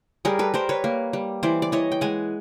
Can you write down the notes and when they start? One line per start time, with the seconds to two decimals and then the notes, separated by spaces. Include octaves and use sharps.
0.25 G3 G#4 A#4
0.39 A4 B4
0.54 G3 A#4 C5
0.69 B4 C#5
0.84 A#3
1.13 G3
1.43 E3 C5 D5
1.62 D5
1.72 E3 C#5 D#5
1.92 G5
2.01 G#3 F#5 G#5